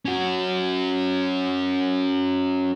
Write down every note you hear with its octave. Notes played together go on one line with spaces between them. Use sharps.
C#4 F#4